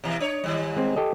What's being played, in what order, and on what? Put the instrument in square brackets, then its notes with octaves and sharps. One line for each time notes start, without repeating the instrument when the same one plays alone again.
[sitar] B2 E3
D4 C#5
G#2 D#3 G3
[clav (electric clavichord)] G#3 C4
G4 A4 D#5